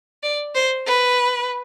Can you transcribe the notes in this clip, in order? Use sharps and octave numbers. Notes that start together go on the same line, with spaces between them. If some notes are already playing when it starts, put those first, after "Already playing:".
D5
C5
B4